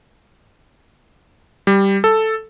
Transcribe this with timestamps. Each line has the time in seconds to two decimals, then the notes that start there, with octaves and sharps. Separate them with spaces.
1.67 G3
2.04 A4